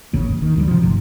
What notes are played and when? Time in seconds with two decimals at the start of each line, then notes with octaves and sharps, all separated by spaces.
0.13 D1 G#1 C#3 A#3
0.29 E1
0.42 D#3
0.56 D2 F#3 G3
0.68 C3 F3
0.83 A1 G#2 C3